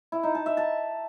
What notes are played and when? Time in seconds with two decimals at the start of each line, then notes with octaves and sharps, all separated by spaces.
0.12 E4
0.23 D#4
0.35 A5
0.46 E5
0.57 A5